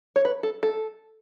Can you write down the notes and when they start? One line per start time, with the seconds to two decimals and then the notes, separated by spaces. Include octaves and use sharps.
0.16 C#5
0.25 B4
0.43 A4
0.63 A4